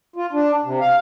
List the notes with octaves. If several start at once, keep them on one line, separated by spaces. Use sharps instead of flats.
F4
D4
C3
F5